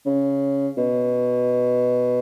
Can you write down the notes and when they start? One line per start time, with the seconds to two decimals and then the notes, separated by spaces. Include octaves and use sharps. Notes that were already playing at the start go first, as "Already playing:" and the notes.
0.06 C#3
0.77 B2